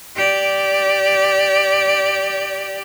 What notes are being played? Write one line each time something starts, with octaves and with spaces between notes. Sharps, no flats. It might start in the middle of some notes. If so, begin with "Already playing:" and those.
G4 D5